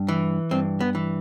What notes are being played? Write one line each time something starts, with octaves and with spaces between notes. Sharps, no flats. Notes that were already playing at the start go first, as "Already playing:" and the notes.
Already playing: G2
E3
G2 C4
B3
E3